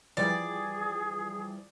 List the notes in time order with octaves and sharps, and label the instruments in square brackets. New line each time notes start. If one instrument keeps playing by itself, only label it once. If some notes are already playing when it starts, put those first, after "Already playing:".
[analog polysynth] E3 F3 G3 [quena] G#4 [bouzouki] D5